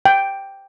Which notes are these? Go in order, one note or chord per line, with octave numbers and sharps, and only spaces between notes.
G5